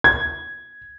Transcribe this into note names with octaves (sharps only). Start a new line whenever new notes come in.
G#6